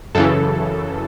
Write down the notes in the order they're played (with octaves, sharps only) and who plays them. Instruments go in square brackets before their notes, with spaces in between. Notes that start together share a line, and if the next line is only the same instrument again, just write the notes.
[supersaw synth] F#2 C#3 E3 A4